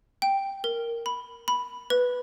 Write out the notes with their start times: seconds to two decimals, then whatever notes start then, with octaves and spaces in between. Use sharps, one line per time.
0.22 G5
0.64 A#4
1.06 B5
1.48 B5
1.90 B4